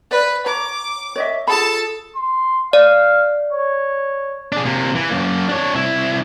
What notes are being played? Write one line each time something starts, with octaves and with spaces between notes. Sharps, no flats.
B4 D5
C#5 A#5 D6
C#5 D#5 E5
F4 G#4 A4 A5 B5
C6
D5 F5
C#5
D4 G#4
C3 A#3
E3
F#2 A#3
D4 C#5
C2 E4